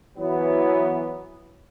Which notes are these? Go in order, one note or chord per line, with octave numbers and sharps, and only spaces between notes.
E3 F#3 B3